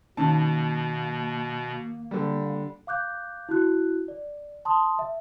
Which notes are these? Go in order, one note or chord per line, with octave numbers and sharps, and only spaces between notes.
B2 D#3 A#3 C#4 D#4 A5
D3 G3
F5 D6 F#6 G6
E4 F#4 F#6
D5
A5 C6 D#6
E5